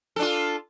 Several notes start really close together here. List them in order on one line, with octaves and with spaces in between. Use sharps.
A4 D4 F4